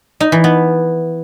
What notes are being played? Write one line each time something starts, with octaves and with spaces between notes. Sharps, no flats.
D#4
E3
B3